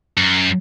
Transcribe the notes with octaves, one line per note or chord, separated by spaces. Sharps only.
F#2